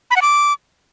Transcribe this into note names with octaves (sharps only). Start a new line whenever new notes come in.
B5
F#5
D6